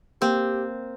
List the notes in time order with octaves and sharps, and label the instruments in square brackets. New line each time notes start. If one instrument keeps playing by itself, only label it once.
[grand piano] A#3 [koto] C4 [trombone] G4